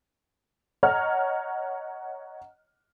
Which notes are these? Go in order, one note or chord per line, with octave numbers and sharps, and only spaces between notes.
C#5 D#5 F#5 A#5 F6